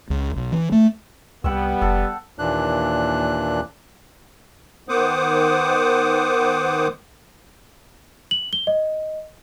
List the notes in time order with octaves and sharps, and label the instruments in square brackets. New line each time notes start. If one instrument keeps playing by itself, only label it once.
[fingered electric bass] C#2
B1
E3
A3
[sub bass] C2 [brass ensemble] G3 B3 [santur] F#5 G5 E6
[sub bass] F1 [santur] A4
[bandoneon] D#2 A#2 E3 D4 F#6
[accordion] D#3 B3 C5 F#5 D6 D#6
[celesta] F#7
G7
D#5